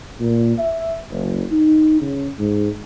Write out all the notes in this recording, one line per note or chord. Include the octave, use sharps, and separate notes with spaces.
A#2
E5
F#1
D#4
C#3
G#2